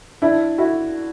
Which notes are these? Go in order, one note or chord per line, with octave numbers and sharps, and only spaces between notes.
D4 E4
E4 F#4